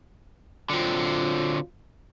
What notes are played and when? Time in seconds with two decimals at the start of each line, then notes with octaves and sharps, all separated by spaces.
0.70 D3 F#3 C4 F4